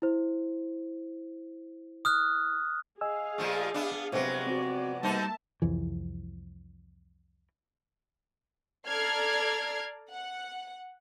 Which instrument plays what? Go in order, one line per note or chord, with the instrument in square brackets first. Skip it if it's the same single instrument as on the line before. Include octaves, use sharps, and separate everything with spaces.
[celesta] E4 C5
[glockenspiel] D#6 F6 F#6
[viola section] G#4 F5 [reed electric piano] D#5 G#5 E6
[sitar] A#2 F3 A3
B3 D4
[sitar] F2 F#3 G#3 [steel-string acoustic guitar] C3 B3
[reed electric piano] C4 F#4 [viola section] D5
[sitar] B2 D#4 C5 [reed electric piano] G3 [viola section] A#3 E5 A5
[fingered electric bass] C2 F2 E3
[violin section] A4 D5 A#5 F6 G#6 C7
F#5